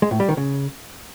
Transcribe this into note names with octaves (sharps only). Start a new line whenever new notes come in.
G#3
A2
G3
D#3
C#3